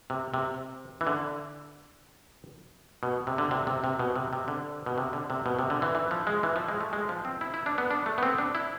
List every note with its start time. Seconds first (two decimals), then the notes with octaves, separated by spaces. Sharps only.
0.10 C3
0.34 C3
1.01 E3
1.07 D3
3.03 B2
3.27 C3
3.38 D3
3.51 C3
3.67 C3
3.84 C3
3.99 B2
4.16 C3
4.33 C3
4.48 D3
4.86 B2
4.98 C3
5.13 D3
5.30 C3
5.46 B2
5.59 C3
5.70 D3
5.82 E3
5.95 E3
6.11 F3
6.27 G#3
6.43 E3
6.56 F3
6.69 G#3
6.81 A3
6.93 G#3
7.09 F3
7.25 C4
7.41 E4
7.54 E4
7.66 D4
7.78 B3
7.91 D4
8.06 A3
8.18 B3
8.23 C4
8.38 D4
8.55 E4